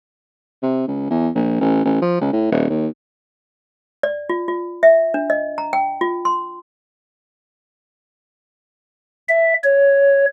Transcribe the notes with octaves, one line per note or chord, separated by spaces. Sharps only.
C3
C#2
E2
A#1
A1
A1
F3
C#2
A2
D#1
D#2
D5
F4
F4
E5
D4
D#5
A#5
G5
F4
C6
E5
C#5